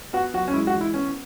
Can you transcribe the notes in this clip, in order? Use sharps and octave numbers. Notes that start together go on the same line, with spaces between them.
B3 F#4
F#3 F#4
C#4
G#3 E4
F#4
E3
E4
B3 C#4